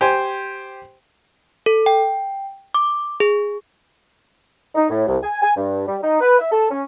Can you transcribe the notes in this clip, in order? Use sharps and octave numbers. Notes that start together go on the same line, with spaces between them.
G4 C5 G#5
A4
G5
D6
G#4
D#4
A2
C2
G#5
G#5
G2
G3
D#4
B4
E5
A4
C#4